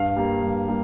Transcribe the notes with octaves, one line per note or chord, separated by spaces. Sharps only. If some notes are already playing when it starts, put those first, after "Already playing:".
Already playing: G2 F5
G3 A#3
G2
G3 A#3